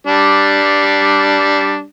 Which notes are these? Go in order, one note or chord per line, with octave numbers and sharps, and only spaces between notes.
G3 D4